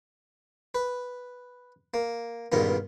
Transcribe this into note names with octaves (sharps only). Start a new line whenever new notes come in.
B4
A#3
C#2 G2 A#2 D#3 B3